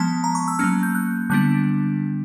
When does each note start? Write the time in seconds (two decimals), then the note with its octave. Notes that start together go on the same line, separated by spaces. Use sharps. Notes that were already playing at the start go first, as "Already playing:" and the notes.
Already playing: F3 G#3 B3 A5
0.24 A#5
0.35 C#6
0.48 E6
0.59 F#3 A#3 C#4 F6
0.83 G6
0.95 F#6
1.30 D3 G3 B3 D4 F#6